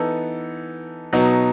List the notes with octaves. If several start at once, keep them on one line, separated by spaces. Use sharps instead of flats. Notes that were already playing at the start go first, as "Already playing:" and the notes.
Already playing: E3 B3 D#4 A4
B2 F#3 B3 D#4